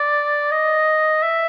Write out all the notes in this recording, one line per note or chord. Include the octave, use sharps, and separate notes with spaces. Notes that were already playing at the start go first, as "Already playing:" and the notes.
Already playing: D5
D#5
E5